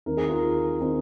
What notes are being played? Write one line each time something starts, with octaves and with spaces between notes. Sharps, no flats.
D#2 D#3 C4 A#4
G#4
F4 A#4
D#3 C4